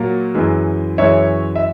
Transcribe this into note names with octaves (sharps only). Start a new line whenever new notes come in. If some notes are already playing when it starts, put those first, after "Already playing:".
Already playing: A#2 F#3 A#3
F#2 E3 G#3
F#2 E3 G#3 C#5 E5
E5